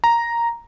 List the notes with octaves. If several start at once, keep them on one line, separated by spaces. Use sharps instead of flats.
A#5